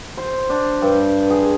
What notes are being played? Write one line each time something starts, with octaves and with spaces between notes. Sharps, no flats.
C5
D4
G2
G#4